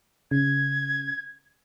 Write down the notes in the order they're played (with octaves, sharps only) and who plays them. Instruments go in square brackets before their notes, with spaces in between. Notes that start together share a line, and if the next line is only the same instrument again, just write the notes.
[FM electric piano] C#3 [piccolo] G#6